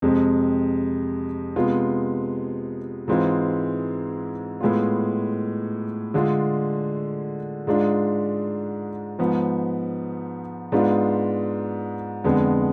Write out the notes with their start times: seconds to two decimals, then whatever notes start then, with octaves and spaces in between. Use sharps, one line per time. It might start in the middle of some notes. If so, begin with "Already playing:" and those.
0.02 F2 C3 G#3
1.56 C3 G#3 B3 F4
3.08 G#2 E3 G#3 C4 F4
4.61 A2 G#3 B3 F4
6.14 D3 G#3 D4 F4
7.67 G#2 G#3 D4 F4
9.19 G#2 F3 B3
10.72 G#2 G#3 B3 D4 F4
12.24 F2 D3 G#3 B3